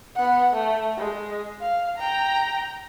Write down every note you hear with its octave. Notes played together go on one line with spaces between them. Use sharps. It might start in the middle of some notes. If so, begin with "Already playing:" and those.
B3 F#5
A3
G#3
F5
G5 A#5